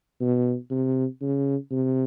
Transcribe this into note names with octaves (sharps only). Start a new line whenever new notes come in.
B2
C3
C#3
C3